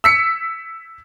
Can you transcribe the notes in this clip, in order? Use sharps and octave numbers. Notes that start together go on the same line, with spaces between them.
E6 B6 C#7